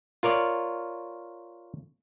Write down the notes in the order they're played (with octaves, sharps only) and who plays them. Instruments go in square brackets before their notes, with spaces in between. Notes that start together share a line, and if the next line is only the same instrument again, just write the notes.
[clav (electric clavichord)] F4 A#4 C#5 D5